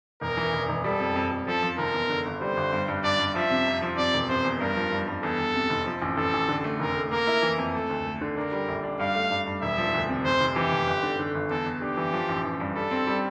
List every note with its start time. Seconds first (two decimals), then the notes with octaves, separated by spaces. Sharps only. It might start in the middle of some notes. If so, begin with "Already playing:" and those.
0.21 E1 A#4
0.37 E3
0.53 E1
0.69 E1
0.84 G3 A4
1.00 F2
1.16 F2
1.31 F2
1.47 F3 A4
1.63 F3
1.78 F1 A#4
1.94 E2
2.10 D3
2.26 G1
2.41 G3 C5
2.57 G1
2.73 G2
2.88 G2
3.04 G2 D5
3.19 G2
3.35 F3 E5
3.51 C3
3.67 F2
3.82 F3
3.97 C3 D5
4.14 E1
4.29 C3 C5
4.45 E2
4.60 G2 A#4
4.76 F3
4.92 G2
5.07 G2
5.23 E2 A4
5.38 E2
5.54 C3
5.70 F1
5.86 F3
6.02 A1
6.17 A1 A4
6.33 A1
6.49 D3
6.64 A3
6.80 F1 A#4
6.96 A3
7.11 A#3 A#4
7.27 E4
7.42 E3
7.58 F2
7.74 A3 A4
7.89 D2
8.06 A3
8.21 D3
8.37 D4 A#4
8.52 G3
8.68 A#1
8.83 D4
8.99 G2 F5
9.15 A3
9.30 G2
9.46 G2
9.62 E1 E5
9.78 F3
9.94 D2
10.09 C3
10.24 F1 C5
10.41 F1
10.56 E3 G4
10.72 F1
10.87 G1
11.03 D3
11.19 D3
11.35 G1
11.50 E2 A4
11.66 E2
11.81 D4 G4
11.97 E3
12.13 F3
12.29 A1
12.44 A1
12.60 G2
12.75 G3 A4
12.91 C4
13.07 G3